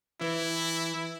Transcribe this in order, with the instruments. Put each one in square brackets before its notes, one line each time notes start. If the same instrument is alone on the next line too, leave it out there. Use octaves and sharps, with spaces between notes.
[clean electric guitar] E3 [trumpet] E4